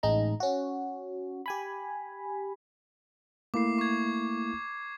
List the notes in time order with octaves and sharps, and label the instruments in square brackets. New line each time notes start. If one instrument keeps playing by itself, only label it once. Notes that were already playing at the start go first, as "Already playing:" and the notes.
[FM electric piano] A1 G#3 D#4 A#5
C#4 F#4
G4 G#5 B5
[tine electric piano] A3 A#3 E4 [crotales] D6 C7
[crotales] C#6 G#6